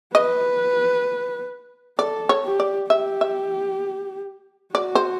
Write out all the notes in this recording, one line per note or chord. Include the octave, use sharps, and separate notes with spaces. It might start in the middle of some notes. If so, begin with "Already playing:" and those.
B4 D#5
A4 D5
C#5
G4
D5
G4 E5
E5
F#4 D5
C5